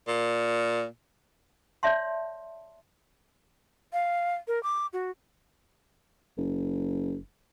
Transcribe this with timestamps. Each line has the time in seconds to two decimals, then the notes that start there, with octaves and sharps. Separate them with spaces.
0.08 A#2
1.83 C#5 D5 E5 A5 C6
3.93 F5
4.48 A#4
4.63 D6
4.93 F#4
6.37 F#1